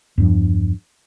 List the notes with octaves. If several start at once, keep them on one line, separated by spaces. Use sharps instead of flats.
E2 G2 F3